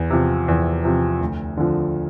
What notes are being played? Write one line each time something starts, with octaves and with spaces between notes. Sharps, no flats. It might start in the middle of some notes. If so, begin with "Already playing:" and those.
Already playing: E2
C3 F3
E2
C3 F3
D2
D3 F3